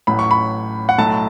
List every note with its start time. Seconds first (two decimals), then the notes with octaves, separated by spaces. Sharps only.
0.07 A1 A2 F#3 B5
0.19 C#6
0.31 B5
0.89 F#5
0.98 B1 A2 F#3 A3 A5